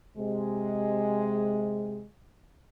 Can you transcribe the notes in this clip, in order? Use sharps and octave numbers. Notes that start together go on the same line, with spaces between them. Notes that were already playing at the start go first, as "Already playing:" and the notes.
C3 G#3